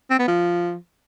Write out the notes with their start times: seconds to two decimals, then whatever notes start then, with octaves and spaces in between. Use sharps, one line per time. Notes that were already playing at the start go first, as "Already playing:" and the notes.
0.10 C4
0.19 B3
0.28 F3